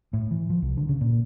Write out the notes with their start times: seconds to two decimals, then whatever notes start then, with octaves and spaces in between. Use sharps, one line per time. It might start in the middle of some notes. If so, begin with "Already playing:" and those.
0.13 A2
0.31 E3
0.50 F3
0.62 C2
0.77 D3
0.89 C#3
1.01 A#2